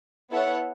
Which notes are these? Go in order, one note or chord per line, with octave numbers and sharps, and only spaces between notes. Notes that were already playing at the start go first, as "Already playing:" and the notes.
B3 E4 A4 C#5 F#5